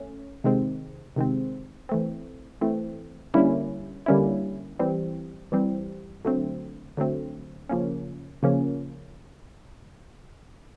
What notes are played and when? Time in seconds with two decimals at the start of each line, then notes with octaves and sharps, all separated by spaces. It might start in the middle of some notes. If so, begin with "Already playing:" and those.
Already playing: A3 C#4
0.44 C3 D#3 G#3 C4
1.16 C3 D#3 G#3 C4
1.89 E3 A3 C4
2.61 E3 A3 C4
3.34 D3 G3 A#3 C#4 E4
4.06 D3 G3 A#3 C#4 E4
4.79 E3 G3 C4
5.52 E3 G3 C4
6.25 D3 F#3 A3 C4
6.97 D3 F#3 A3 C4
7.69 C#3 F3 A#3 C#4
8.43 C#3 F3 A#3 C#4